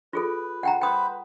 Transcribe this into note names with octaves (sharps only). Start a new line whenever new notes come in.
F4 G#4 A4 B4
F#5 G5 A#5
B4 C5 G5 B5 D#6